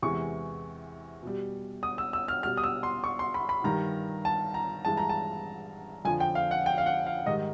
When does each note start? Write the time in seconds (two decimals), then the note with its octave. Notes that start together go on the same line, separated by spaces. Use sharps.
0.03 E2 C3 E3 G#3 C#6
1.23 B2 G3
1.83 D#6
1.98 E6
2.13 E6
2.28 F6
2.43 B2 G3 F6
2.57 D#6
2.64 E6
2.83 C6
3.04 C#6
3.19 C6
3.34 B5
3.49 B5
3.64 G2 D#3 G3 A#5
4.25 A5
4.54 A#5
4.85 G2 E3 G#3 A5
4.97 A#5
5.09 A5
6.05 F2 D3 F3 G#5
6.20 G5
6.35 F5
6.51 F#5
6.66 G5
6.78 F5
6.86 F#5
7.06 F5
7.26 G#2 D#3 G3 D#5